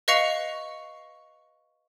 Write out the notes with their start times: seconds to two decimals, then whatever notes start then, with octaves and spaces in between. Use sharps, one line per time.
0.08 B4 D#5 F5 C#6 C#7 F7